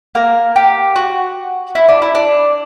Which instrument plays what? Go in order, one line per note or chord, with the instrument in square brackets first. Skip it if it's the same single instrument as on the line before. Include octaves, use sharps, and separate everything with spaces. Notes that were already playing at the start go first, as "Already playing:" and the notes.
[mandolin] A#3 A#4
G4
F#4
E4
D4
E4
D4